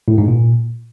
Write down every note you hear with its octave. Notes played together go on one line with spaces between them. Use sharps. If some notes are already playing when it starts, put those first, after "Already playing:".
A2
G#2
A#2